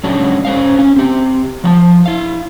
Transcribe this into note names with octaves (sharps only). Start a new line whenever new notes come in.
F#3 G#3 C#4 D4 F#4
C#4 C5 F5
C#4
C4 G4
F3 F#5 A5
E4 F5